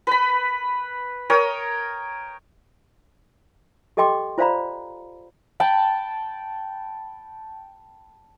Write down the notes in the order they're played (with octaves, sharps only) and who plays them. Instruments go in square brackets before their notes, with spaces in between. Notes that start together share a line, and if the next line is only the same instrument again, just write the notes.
[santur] B4 B5
A#4 C#5 G5 D#6
[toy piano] G4 A4 D#5 G5 C6 D6
F4 C5 D5 F5 A#5 B5
[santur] G5 A5 B5